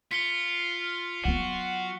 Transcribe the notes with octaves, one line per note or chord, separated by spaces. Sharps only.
F4 B6 C#7 G7
F#3 B3 F#4